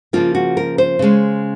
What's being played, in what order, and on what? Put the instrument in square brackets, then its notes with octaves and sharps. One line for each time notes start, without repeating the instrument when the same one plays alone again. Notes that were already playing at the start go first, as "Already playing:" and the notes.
[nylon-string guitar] C#3 F3 A#3 F4
F#4
A#4
C5
C#3 G#3 C#4